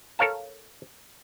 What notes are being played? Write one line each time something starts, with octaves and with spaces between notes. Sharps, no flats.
A4 A#4 C#5 F5 A5